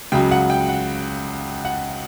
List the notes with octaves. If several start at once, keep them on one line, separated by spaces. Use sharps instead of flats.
C#2 C#3 F#3 G5
F#5
G5
F#5
F#5